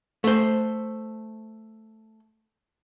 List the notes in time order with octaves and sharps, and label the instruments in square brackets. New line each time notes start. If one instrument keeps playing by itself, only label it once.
[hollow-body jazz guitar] A3 C5